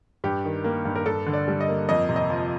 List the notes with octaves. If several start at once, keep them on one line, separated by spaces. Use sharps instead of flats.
G2 G4
D#3
A#3
G2
A#4
G2 A4
D3
D5
G3
D#5
A#3
F2 D#5
C3
D#5
F3